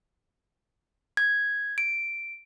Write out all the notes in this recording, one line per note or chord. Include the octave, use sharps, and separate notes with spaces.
G#6
D7